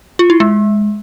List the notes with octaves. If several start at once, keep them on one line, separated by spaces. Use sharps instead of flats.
F4
E4
G#3